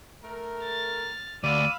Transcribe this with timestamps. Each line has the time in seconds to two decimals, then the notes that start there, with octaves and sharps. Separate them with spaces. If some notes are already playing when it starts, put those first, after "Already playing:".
0.24 A3 A#4
0.63 F6 A6
1.44 D2 D5 F5 B5 E6 D#7